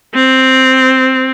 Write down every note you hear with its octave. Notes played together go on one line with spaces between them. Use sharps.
C4